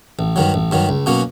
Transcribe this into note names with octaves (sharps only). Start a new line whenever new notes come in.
A1
G2 D#3 F#3
A1
G2 D#3 F#3
C#2
B2 F#3 A#3 C#4